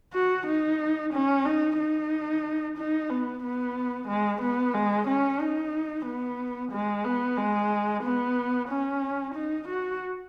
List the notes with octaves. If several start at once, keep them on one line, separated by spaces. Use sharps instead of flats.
F#4
D#4
C#4
D#4
D#4
D#4
B3
B3
G#3
B3
G#3
C#4
D#4
B3
G#3
B3
G#3
B3
C#4
D#4
F#4